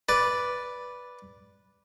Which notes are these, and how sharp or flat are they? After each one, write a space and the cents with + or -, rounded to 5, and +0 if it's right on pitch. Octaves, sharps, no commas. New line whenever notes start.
B4 -5 D5 -5